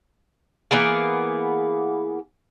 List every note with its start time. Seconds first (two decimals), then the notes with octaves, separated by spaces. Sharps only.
0.71 E3 A#3 B3 G#4